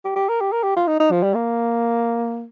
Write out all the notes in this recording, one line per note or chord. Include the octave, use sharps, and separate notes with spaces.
G4
G4
A#4
G4
A#4
G4
F4
D#4
D#4
F3
G3
A#3